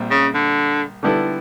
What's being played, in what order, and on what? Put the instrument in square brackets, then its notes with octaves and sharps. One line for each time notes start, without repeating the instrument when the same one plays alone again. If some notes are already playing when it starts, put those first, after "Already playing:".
Already playing: [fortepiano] A#1 A#2 G3 C4
[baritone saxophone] C#3
D3
[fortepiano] D3 G3 B3 E4 A4